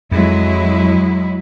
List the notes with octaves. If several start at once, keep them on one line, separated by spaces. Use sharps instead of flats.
F2 F#3 G#3 E4